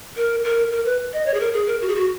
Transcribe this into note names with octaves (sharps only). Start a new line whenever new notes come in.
A#4
A#4
A#4
B4
D#5
C#5
G#4
A#4
G#4
A#4
F#4
G#4
F#4